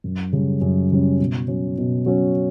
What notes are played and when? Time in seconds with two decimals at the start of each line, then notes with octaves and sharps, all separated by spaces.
0.04 F#2
0.33 C#3 G3 C#4
0.61 F#2
0.92 C#3 G3 C#4
1.19 B2
1.48 F#3 C#4
1.78 B2
2.06 F#3 C#4